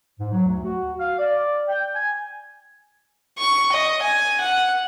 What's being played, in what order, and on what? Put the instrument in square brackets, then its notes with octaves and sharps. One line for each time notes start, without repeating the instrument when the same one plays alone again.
[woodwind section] G#2
F#3
D2
F#4
F5
D5
G5
G#5
[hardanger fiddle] C#6
D#5
G#5
F#5